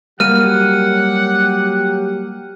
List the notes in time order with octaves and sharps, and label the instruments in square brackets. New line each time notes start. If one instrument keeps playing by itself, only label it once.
[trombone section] F#3 G4 [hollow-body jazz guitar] G3 A#3 [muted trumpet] F#5 [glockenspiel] F6 D#7